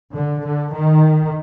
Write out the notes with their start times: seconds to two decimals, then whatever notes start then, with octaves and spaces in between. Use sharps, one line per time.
0.14 D3
0.44 D3
0.74 D#3